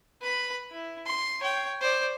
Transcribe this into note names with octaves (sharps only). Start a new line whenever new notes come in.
B4 B5
E4
C6
C#5 G5
C5 D5